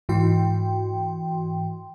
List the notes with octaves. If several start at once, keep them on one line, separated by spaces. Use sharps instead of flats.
G#2 E3 F#4 G5 C6